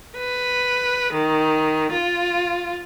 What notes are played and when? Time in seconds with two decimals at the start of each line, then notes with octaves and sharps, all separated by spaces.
0.18 B4
1.13 D#3
1.93 F4